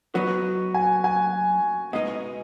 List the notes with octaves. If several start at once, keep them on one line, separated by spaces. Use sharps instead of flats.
F#3 B3 D#4 F#4
G#5
G#5
B2 G#3 D#4 D#5